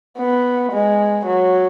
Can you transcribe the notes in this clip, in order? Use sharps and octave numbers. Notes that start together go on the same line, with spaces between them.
B3
G#3
F#3